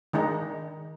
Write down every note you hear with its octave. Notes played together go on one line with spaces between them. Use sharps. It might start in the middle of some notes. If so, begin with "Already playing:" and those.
D#3 G#3 D4 D#4